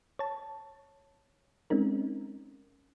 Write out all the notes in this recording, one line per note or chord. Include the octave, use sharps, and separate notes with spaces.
C#5 A5
G#3 C4 C#4 D#4 A#4